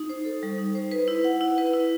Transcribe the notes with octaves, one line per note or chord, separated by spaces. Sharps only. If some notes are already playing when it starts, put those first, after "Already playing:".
Already playing: D#4
C5
A4
G3
D#4
C5
B4
E4
F#5
E4
B4
E4